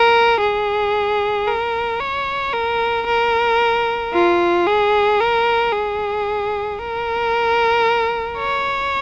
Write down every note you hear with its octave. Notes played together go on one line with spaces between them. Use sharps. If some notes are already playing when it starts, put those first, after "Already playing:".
Already playing: A#4
G#4
A#4
C#5
A#4
A#4
F4
G#4
A#4
G#4
A#4
C#5